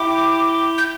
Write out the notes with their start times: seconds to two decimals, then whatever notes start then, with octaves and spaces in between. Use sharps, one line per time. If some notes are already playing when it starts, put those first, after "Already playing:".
Already playing: E4 G4 D6
0.78 G6